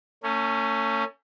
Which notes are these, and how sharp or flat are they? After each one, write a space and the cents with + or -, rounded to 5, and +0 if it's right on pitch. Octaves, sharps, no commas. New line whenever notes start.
A3 +40 C#4 +5